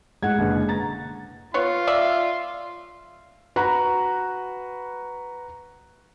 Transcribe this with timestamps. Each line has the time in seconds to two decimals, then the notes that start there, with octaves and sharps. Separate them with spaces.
0.23 A2 G#3 F#5 G#6
0.38 F#1 B2 D3
0.69 A#5 A6
1.54 B3 F4 C#5 C6
1.87 D5 E5
3.56 F#4 B4 A#5 B5 C#6 F#6